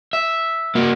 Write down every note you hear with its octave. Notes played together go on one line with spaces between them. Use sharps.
E5
A#3 F#4